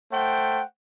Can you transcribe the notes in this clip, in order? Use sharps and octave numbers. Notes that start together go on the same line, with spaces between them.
A3 C5 F#5 G5